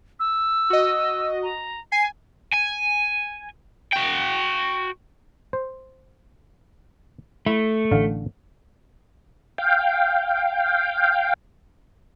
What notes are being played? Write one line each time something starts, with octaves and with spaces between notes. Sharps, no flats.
E6
F#4 D#5
A#5
G#5 C7
G#5
F#4 G5
C5
A3 E4
A1 D3 F5
F5 G5